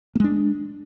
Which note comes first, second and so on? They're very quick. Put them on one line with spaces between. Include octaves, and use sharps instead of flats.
A#3 G#3 D4